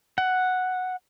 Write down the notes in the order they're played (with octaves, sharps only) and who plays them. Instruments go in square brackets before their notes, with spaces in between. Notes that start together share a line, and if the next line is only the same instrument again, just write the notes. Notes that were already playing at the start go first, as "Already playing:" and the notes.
[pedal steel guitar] F#5